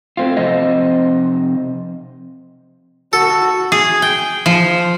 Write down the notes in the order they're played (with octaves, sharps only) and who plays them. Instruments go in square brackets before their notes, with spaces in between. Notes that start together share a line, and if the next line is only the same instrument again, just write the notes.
[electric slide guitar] A3 C4 F4
C3 F3 C4 C5 D#5
[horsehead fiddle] F#4 [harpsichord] A4
[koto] G#4
G5
F3